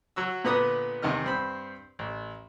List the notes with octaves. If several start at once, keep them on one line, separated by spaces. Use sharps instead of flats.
F#3 F#4 E6
A#2 D3 B3 B4 A#5 D#6
E2 C3 D#3 D#5 F6
G2 C4 B5
A1